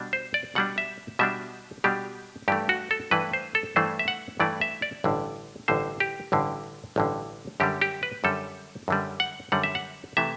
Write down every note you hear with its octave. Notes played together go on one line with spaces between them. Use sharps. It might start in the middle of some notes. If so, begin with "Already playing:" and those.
Already playing: B2 G3 D4
C5
D5
B2 G3 D4 F#5
E5
B2 G3 D4 E5
B2 G3 D4 G4
G2 E3 A3 G4
F#4
A4
G2 E3 A3 B4
C5
A4
G2 E3 A3 C5
E5
F#5
G2 E3 A3 D5
E5
D5
A1 G2 D3
A1 G2 D3 C5
G4
A1 G2 D3
A1 G2 D3
F#2 D3 G3 G4
G4
B4
F#2 D3 G3 A4
F#2 D3 G3
F#5
F#2 D3 G3 F#5
E5
F#5
C3 E3 A3 E5